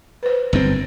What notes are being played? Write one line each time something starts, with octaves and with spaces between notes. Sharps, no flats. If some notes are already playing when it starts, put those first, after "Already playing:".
B4 C5
G1 F#2 C4